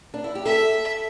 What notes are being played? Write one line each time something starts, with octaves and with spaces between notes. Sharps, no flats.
D4
E4
G4
A4 E5